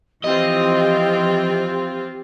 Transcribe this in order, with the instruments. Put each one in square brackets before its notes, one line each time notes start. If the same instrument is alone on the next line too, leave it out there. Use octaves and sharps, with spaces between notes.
[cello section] E3 F3 [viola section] C4 F4 [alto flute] G4 [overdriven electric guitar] D#5